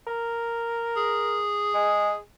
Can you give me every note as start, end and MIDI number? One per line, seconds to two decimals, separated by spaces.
0.07 1.40 70
0.97 2.19 68
1.74 2.13 56